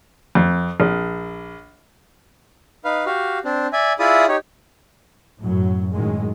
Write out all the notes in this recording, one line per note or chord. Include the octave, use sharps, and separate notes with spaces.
F2
A#1
D#4 B4 F5
F#4 G4 F5
C4 D4
D5 E5 G#5
E4 F4 G#4 D5 E5 D#6
D#4 G4 C#5
F#2 A2 F#3
F#2 A2 D#3 F#3 G#3